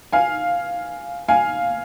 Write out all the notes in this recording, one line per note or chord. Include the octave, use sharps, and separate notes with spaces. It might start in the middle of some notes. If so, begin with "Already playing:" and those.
F5 G#5
F5 G#5